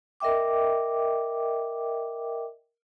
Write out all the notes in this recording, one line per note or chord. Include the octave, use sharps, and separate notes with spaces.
A#4 D#5 E5 G5 D6